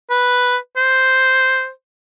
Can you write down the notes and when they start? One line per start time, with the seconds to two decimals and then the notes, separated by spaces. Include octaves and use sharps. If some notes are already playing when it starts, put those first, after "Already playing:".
0.10 B4
0.77 C5